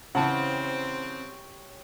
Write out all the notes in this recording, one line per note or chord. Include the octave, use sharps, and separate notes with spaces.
C#3 E3 C4 G4 C#5 F#5 A5